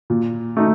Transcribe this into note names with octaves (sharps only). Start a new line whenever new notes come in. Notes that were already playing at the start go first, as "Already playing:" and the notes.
A#2
A3 D#4